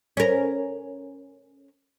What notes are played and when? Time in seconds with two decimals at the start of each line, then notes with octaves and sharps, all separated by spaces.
0.17 C#4 A#4